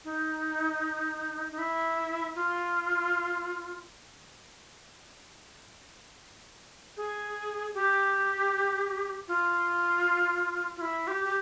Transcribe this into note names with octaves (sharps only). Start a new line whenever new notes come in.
D#4
D#4
E4
F4
G#4
G4
F4
F4
E4
G4
G4